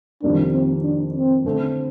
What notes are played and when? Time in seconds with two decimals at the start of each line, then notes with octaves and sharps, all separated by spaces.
0.22 F2 C3 D#3 G3 A#3 D4
0.53 C4
0.84 D4
1.14 C4
1.45 D3 A3 C4